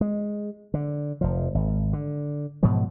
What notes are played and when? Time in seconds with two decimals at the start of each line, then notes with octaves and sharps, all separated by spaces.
0.01 G#3
0.74 D3
1.21 F1 F3
1.55 G#1
1.93 D3
2.63 G#2 B2 F3 F#3